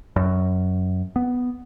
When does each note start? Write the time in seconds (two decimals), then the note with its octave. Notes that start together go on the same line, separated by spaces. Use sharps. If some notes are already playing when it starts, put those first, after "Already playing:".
0.16 F#2
1.16 B3